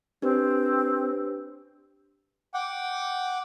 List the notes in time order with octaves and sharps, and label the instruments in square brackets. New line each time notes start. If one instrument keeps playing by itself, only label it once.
[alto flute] C4 [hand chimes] D4 G4 B4
[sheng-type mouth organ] F#5 G5 D6